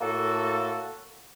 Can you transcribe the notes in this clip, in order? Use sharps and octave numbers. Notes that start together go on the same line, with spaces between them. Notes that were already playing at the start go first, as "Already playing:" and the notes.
A2 A#3 F#4 A4